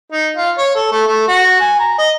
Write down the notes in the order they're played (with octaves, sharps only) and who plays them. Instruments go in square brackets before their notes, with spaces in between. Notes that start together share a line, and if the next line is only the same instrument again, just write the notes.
[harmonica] D#4
F4
C#5
A4
A3
A3
F#4
G#5
A#5
D#5